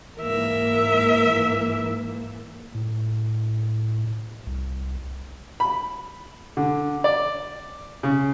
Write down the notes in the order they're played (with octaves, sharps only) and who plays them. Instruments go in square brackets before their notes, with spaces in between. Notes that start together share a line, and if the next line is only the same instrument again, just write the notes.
[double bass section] G#2 E3 A#3 [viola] A#4 E5
[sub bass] A2
C2
[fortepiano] B5
D3
D5
C#3